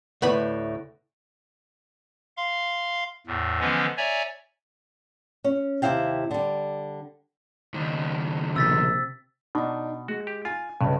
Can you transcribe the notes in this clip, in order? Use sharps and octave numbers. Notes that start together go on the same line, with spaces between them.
D2 A2 B4 B5
F5 C6
E2 A2
D3 E3 F3 G#3 B3 C#4
C#5 D5 E5 G#5 A#5
C#4
D#2 C3 D#4 E4 F5 G5
D3 G3
C#2 D#3
A#1 C3 E6 A6 B6
B2 D4 D#4
G#3 F#4
G4
F4 G#5
B1 G2 C#3